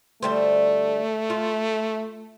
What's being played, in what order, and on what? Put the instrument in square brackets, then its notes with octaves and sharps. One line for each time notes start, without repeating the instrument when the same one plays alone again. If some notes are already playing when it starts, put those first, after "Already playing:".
[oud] D2 G3 C5 [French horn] A3
[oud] F4